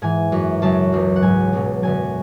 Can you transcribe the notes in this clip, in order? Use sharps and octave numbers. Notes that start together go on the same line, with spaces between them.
G#2 E3 G#5
F#2 E3
F#2 C#3 F#3 A5
C#2 C#3 F#3
F#5
G#2 F#3 G#5
C#2 B2 F#3
F#2 D3 F#3 G#5